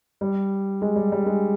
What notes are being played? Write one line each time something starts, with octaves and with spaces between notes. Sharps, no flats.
G3
G#3
G3
G3
G#3